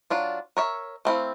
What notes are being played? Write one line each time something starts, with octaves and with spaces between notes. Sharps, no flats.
F#3 D4 F4
A#4 C#5 E5
A3 C4 E4 F5